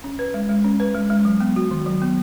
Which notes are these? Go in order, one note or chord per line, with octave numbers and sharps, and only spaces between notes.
C#4
B4
G#3
G#3
C#4
B4
G#3
G#3
F#3
B3
F#4
D#3
F#3
B3